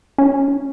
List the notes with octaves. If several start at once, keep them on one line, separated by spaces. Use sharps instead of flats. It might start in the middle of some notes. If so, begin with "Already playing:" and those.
C#4